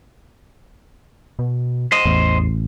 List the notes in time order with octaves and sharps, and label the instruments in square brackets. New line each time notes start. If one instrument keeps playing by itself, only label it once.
[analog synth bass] B2
[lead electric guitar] C5 D#5
[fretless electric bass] A1 [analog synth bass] E2